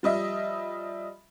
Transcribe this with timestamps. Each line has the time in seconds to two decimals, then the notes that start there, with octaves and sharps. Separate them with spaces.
0.03 F3 G3 D#5 E5